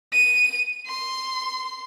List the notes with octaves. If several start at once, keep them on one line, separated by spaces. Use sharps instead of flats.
D#7
C6